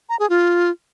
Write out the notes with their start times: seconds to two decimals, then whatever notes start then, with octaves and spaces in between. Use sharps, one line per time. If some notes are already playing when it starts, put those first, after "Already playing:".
0.09 A#5
0.19 G#4
0.30 F4